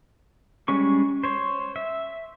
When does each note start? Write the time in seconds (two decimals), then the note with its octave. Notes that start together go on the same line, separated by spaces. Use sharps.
0.68 G3 G#3 C#4 G#4 C#6
1.23 C5 C#5
1.76 E5